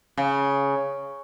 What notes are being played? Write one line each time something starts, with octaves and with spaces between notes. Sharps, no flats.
C#3